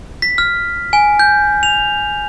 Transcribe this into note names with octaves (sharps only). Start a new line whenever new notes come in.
B6
F6
G#5
G6
F7